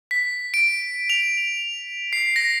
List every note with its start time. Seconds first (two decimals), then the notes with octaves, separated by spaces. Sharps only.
0.11 B6
0.54 D7
1.10 F7
2.13 C7
2.36 A#6